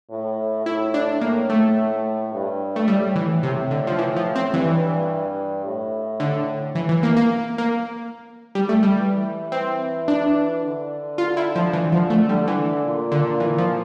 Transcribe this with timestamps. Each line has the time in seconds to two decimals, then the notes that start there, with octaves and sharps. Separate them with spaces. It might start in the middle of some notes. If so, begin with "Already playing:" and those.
0.10 A2
0.66 A2 E4
0.94 D4
1.21 A2 A#3
1.49 A3
2.33 G2
2.76 A3
2.87 A2 G3
3.16 E3
3.43 C3
3.71 D3
3.87 F3
3.98 E3
4.16 F3
4.36 C4
4.54 G2 E3
5.65 A2
6.20 D3
6.75 E3
6.89 E3
7.03 A#3
7.17 A#3
7.58 A#3
8.55 G3
8.69 A3
8.83 G3
8.97 E3
9.52 E3 C4
10.08 D4
10.63 D3
11.18 F4
11.37 E4
11.55 F3
11.73 E3
11.92 F3
12.10 A3
12.29 D3 G3
12.48 E3
12.85 A#2
13.12 D3
13.40 E3
13.58 F3